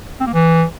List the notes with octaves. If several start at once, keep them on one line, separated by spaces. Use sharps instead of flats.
C4
A#3
E3